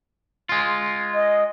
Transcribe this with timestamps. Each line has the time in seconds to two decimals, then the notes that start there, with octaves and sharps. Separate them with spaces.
0.49 G#3 F4
1.14 D#5